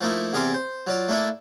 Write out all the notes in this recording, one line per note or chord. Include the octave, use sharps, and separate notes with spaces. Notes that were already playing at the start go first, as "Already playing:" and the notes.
F3 A3 A#3 D#4 E4
E2 C3 G#4 A#4 D5 C6
C5
F#3 F4 D5
A3 A#3 D4 E4 A4